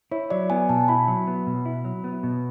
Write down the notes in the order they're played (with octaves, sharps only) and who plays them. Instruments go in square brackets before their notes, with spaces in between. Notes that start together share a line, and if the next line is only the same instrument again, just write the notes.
[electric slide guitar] E4 [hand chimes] C#5
[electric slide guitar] F#3 [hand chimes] D5
[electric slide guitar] B3 [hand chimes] G#5
[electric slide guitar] B2 [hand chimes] A5
[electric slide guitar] E4 [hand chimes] B5
[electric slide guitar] F#3
B3
B2
E4
F#3
B3
B2